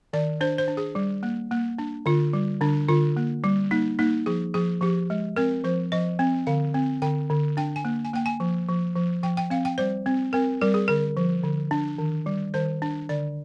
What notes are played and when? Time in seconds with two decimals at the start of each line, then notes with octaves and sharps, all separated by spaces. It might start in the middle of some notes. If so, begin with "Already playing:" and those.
0.13 D#3 D5
0.41 D4 C5
0.58 C5
0.68 D4
0.77 G#4
0.95 G3
1.23 A#3
1.51 A#3
1.78 D4
2.06 D3 F4
2.33 G3
2.61 D3 D4
2.89 D3 F4
3.17 A#3
3.44 G3
3.71 A#3 D#4
3.99 A#3 D#4
4.26 F3 G#4
4.54 F3 G#4
4.81 F3 G4
5.10 G#3
5.36 C4 A#4
5.64 F3 C5
5.92 F3 D#5
6.19 C4
6.47 D3 F5
6.74 C4
7.02 D3 G5
7.30 D3
7.57 D4 G5
7.76 G#5
7.85 A#3
8.05 G#5
8.13 A#3 G5
8.26 G#5
8.40 F3
8.69 F3
8.96 F3
9.23 F3 G5
9.37 G5
9.50 C4 F5
9.65 G5
9.78 G3 C5
10.06 C4
10.33 C4 A#4
10.61 G3 A#4
10.74 G#4
10.88 D3 A#4
11.17 F3
11.43 D3
11.71 D4
11.98 D#3
12.26 G3
12.54 D#3 C5
12.82 D4
13.09 D3 D5